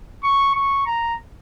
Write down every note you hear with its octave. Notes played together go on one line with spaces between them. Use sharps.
C#6
C#6
A#5